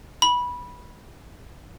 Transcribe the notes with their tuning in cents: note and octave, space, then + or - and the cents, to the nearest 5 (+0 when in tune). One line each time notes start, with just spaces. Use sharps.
B5 -15